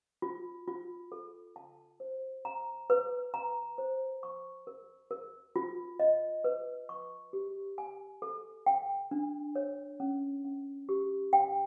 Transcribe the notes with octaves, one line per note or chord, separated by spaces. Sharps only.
F4
F4
A4
A5
C5
A#5
B4
A#5
C5
C#6
A#4
A#4
F4
D#5
B4
C#6
G4
G#5
A4
G5
D4
C#5
C#4
C#4
G4
G5